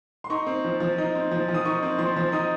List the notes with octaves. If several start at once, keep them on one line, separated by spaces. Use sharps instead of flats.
C6
D#4 C#6
C4
F3
F3
D#4
C4
F3
F3
D#6
D#4 C#6
C4
F3 C6
F3
D#4 D#6